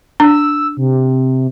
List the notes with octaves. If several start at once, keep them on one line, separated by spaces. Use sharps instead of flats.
D4 E6
C3